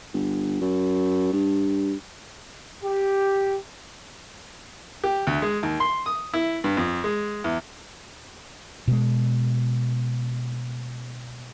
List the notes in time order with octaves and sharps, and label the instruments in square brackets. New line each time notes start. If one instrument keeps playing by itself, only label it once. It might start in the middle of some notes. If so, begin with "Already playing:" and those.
[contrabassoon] G1
F#2
G2
[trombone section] G4
[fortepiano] G4
D2
G#3
D#2
C6
D#6
E4
G2
F2
G#3
E2
[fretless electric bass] B2 G#3